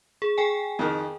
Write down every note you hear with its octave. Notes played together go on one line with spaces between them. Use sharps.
G#4
G#4 G5 G#5
F2 D#3